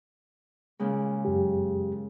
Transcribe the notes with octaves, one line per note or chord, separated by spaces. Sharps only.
A#2 C#3 G#3
F#2 G4